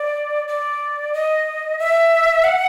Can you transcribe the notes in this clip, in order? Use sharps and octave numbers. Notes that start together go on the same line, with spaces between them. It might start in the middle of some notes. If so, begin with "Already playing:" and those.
Already playing: D5
D5
D#5
E5
F#5